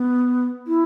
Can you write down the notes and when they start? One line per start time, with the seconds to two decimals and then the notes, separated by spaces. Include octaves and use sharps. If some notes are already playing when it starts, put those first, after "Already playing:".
Already playing: B3
0.67 E4